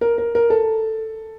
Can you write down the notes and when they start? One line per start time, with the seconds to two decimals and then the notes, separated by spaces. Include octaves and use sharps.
0.01 A#4
0.18 A#4
0.35 A#4
0.50 A4